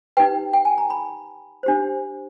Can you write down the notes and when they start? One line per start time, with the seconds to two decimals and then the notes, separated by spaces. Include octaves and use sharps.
0.17 D#4 G4 B4 G5
0.53 G5
0.65 G#5
0.78 A#5
0.90 B5
1.63 D4 G4 C5